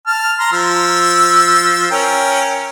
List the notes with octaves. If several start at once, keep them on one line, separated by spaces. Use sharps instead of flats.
A5 F6
A#5 C6
F3 E6
C#4 A#4 G5